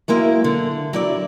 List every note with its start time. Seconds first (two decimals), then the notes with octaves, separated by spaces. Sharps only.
0.08 F#3 G#3 A#3 E4
0.44 D3
0.93 F#3 E4 D5